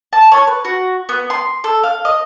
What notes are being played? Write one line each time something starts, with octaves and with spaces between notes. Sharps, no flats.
A5
C#5
B4
F#4
B3
C6
A4
F5
D#5